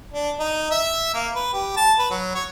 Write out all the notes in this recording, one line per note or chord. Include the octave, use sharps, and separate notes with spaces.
D4
D#4
E5
A#3
B4
G4
A5
B4
F#3
C#5